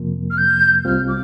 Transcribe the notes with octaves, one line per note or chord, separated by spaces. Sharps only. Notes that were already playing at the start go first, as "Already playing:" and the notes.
Already playing: F2 C3 F3 A#3
F6
G6
C2 C3 G3 C4 F4 F6
D6